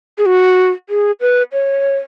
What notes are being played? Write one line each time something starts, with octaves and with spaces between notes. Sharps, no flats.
G#4
F#4
G#4
B4
C#5